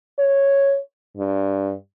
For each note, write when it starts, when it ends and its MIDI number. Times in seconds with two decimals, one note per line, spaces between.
0.19 0.79 73
1.17 1.73 43